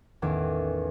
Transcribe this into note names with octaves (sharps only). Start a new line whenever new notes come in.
A1 E2 D#3 C#4 D6